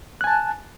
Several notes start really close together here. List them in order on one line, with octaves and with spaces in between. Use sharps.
F#6 G#5 A5